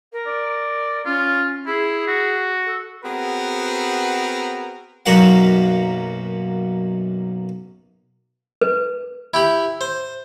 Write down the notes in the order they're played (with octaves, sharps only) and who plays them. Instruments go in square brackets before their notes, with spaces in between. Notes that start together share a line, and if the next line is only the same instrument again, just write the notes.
[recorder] A#4
[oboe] D5
[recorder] C#4 [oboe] F4
[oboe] E4 [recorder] G#4
[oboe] F#4
[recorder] A4
[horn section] B3 C4 F#4 G#4 A#4 B4
[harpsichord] B1 F#2 A#3 F#4 F5 F#5
[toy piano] B4
[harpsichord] E4 G4 B5
C5